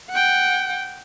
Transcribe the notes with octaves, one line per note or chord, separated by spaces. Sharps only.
F#5 G5